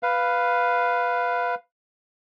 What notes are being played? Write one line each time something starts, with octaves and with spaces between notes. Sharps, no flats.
B4 F5